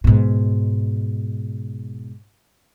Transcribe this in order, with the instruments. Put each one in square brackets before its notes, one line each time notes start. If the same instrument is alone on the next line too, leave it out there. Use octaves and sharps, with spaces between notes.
[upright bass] G#2 B2